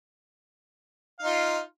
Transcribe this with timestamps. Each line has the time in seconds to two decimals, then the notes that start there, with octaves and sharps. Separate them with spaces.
1.19 F5
1.23 D#4
1.26 F4